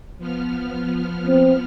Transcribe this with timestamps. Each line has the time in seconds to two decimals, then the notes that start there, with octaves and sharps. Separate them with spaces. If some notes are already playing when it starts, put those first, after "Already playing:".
0.18 F3 B3 F6
1.27 C4